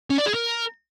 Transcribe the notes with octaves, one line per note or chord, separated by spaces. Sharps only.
C#4
D5
G#4
A#4